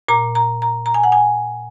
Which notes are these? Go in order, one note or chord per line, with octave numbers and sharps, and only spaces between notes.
A#2 A#5
A#5
A#5
A#5
G#5
F#5
G#5